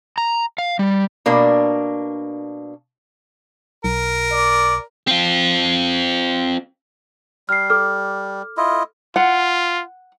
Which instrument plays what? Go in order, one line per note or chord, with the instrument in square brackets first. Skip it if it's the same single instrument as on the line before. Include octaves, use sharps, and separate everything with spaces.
[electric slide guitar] A#5
F5
G3
[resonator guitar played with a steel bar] B2 A#3 D4
[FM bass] B1 [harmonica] A#4
[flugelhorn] D5
[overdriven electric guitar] C4 F4
[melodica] G3 [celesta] F6 C7
[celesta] A4 D6 F6
[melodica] E4 F4 D#5
[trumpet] F4 [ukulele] F#5